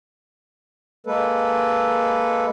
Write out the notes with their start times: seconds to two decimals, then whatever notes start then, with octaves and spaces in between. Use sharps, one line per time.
1.06 G#3 A#3 A4 B4